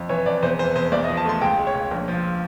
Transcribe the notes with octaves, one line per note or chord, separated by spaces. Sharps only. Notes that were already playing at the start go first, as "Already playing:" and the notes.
Already playing: F2
E3 C#5
F2 D5
E2 C5
E3 C5
E2 C5
B1 D5
D#5
F3
A5
A3 C6
C#2 G5
G#3
C#5
C#2
A#1
F3